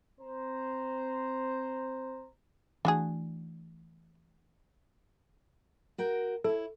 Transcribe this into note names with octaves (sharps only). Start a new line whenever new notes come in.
C4 C5 A#5
E3 A3 D4 F#4 G#4
F#4 A#4 G5
E4 A4 C#5